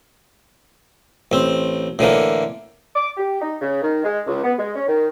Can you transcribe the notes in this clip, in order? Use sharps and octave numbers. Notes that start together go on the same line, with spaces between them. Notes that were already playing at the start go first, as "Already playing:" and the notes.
A1 C4
A2 D3 E3 A#3
D6
G4
D#4
C#3
D#3
G#3
C#2
B3
G#3
C#4
D#3